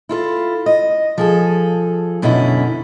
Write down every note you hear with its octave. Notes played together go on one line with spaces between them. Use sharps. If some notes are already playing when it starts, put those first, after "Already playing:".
E4 F4 A4
D#5
F3 G#4 A4
F#2 B2 D3 C#4 E4